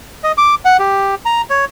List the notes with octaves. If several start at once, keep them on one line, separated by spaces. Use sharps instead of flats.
D#5
D6
F#5
G4
A#5
C#5